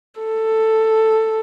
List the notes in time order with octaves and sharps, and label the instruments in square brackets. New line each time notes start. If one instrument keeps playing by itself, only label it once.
[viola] A4